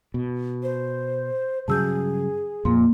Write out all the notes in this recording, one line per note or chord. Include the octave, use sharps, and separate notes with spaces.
B2
C5
G2 C#3 F#3 G#4 A5 E6 G6
F2 A#2 A#3 C6